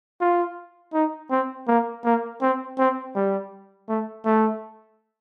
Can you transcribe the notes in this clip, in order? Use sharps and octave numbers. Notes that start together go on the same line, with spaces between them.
F4
D#4
C4
A#3
A#3
C4
C4
G3
A3
A3